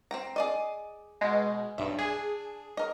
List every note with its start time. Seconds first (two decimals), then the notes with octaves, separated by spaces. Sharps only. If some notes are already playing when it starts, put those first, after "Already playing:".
0.11 C4 G5 A#5
0.36 G#4 D5 D#5
1.21 B2 G#3
1.78 B1 G2 E5
1.99 D4 G#4
2.77 A#4 D#5